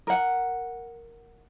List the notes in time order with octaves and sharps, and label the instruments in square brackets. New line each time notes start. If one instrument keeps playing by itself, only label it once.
[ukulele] A#4 F#5